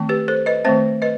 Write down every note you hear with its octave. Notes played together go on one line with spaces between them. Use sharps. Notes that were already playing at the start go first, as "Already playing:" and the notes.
Already playing: D#3 A3 C4
G4 B4
A4 C5
B4 D#5
D#3 A3 C4 C5 E5
B4 D#5